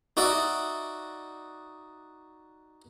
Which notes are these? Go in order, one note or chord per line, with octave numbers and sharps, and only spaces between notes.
D#4 F#4 D5 E5